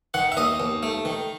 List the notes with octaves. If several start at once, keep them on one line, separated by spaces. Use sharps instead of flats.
D#3 F#5
E5
D#2 D#5
D#2
A3
D#3